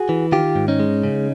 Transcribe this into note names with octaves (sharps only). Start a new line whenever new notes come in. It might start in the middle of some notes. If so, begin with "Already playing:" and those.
Already playing: F#4 G#4
E3
D#3 F4 G4
G#2
C#4 D#4
G#3
C#3